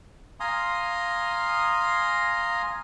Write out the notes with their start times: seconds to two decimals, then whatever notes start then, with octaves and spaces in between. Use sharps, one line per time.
0.40 F5 G#5 A#5 C6 D#6